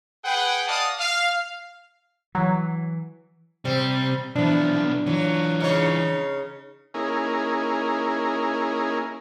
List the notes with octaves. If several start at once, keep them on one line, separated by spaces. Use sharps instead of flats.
G#4 B4 F#5 G5
D5 D#5 F5 F#5 A5 D#6
F5
E3 F#3
C3 G3 C4
B1 E3 F3 B3 D4
E3 F#3 F4
C#3 D#4 C#5
A#3 C#4 D#4 E4 G#4 A#4